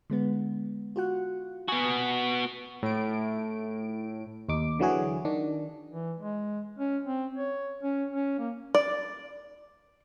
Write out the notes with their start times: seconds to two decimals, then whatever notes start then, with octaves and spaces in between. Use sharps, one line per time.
0.10 D3 G#3 B3
0.96 F4 F#4 F#5
1.68 B3 F#4 G#5 D#6
2.83 A2 D7
4.49 D#2 D#4 D6
4.79 D3 E3 F#3 E4 F#4 G#4
5.25 D#3 D4
5.91 E3
6.20 G#3
6.79 C#4
7.07 C4
7.38 C#5
7.83 C#4
8.11 C#4
8.39 A#3
8.75 D5